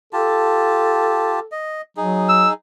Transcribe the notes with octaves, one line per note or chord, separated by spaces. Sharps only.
F4 G4 A4 A5
D#5
F#3 D#4 G#4
E6